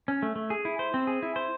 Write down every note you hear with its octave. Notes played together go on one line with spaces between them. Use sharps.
C#4
A3
A3
G#4
E4
C5
C4
G#4
E4
C5